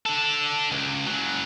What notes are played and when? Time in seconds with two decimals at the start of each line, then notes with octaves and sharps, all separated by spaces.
0.06 D4 A4
0.72 C#2
1.06 C#3 F#3